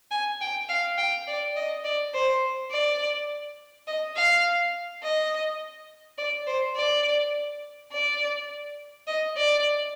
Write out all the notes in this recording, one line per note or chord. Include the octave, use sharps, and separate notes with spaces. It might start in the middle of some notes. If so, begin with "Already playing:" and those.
G#5
G5
F5
G5
D5
D#5
D5
C5
D5
D#5
F5
D#5
D5
C5
D5
D5
D#5
D5